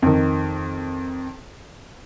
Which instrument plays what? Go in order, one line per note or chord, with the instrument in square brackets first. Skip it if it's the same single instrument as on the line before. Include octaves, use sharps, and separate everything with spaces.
[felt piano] F2 D#3